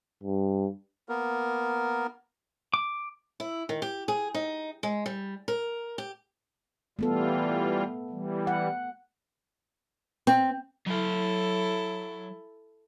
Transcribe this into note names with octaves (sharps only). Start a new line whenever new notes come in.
G2
A#3 B3 A#4
D6
E4
D#3
G4
G#4
D#4
G#3
G3
A#4
G4
E3 G3 A3 B3 F4 A4
E3 G3
F#5
C4
F#3 E4 A4 F5